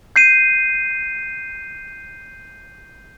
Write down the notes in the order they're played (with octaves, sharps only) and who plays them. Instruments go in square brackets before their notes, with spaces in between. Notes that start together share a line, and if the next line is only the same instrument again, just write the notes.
[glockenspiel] G6 C7 D#7